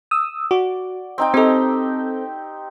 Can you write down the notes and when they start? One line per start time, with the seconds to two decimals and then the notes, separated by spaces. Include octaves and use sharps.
0.11 D#6 E6
0.51 F#4 D5
1.18 C4 D#4 G5
1.34 C4 D#4 G4 A4